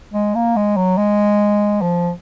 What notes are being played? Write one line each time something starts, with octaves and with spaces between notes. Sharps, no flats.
G#3
A#3
G#3
F#3
G#3
F3